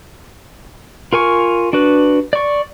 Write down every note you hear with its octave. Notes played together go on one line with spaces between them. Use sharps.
F4 A#4 G#5 C#6
D4 F#4 B4
D5 C#6